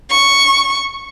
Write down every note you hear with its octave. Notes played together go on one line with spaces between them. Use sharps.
C#6